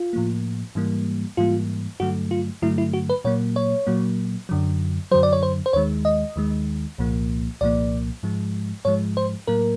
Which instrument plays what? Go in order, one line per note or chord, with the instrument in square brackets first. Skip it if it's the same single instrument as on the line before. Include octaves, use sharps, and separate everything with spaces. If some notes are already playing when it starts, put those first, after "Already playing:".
Already playing: [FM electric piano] F4
A2 F3 A#3
G#2 E3 G3 A#3
G#2 E3 G3 A#3 F4
G2 D3 F#3 A3 F#4
F4
G2 D3 F#3 A3 E4
E4
F#4
B4
A#2 F#3 A#3 C#5
C#5
A#2 F#3 A#3
F#2 D3 F#3
F#2 D3 F#3 C5
D5
C#5
C5
C5
D#2 D#3 G#3 C#5
D#5
D#2 D#3 G#3
C2 A#2 F3 A#3
C2 A#2 F3 A#3 D5
G#2 F3 G#3
G#2 F3 G#3 C#5
C5
A2 F#3 A#3 A#4